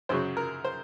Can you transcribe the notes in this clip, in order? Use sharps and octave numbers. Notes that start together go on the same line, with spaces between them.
F#2 C#3 F#3 C5
A#4
C5